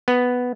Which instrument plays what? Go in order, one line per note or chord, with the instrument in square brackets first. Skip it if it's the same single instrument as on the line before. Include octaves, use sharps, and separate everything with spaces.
[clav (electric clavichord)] B3